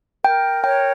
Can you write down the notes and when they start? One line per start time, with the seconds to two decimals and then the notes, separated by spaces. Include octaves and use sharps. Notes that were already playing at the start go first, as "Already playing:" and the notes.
0.24 A#4 G5
0.64 C#5 G5